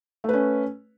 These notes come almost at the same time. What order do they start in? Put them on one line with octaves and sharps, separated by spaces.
A3 B4 C#4